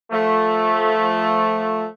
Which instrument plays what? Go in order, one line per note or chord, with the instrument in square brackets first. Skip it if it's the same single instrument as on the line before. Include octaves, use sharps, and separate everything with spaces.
[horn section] F3 A3